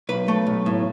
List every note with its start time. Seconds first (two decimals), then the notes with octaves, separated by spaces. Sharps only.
0.09 B1 B4
0.28 A3
0.47 B1
0.66 A2